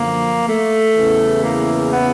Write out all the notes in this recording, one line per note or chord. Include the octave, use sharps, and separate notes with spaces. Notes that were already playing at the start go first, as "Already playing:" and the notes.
Already playing: F#2 D3 F3 A#3
A3
E2 C#3 E3
A#3
B3